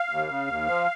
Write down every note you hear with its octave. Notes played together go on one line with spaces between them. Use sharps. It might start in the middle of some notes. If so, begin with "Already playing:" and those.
Already playing: F5
D#2
C#3
D#2
F3